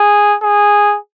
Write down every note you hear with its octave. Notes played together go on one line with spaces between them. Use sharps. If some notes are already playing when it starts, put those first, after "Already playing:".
Already playing: G#4
G#4